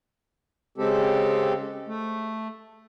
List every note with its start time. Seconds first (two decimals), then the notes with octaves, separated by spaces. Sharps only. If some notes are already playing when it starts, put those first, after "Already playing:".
0.78 C#3 G#3 C4 G4 A4
1.87 A3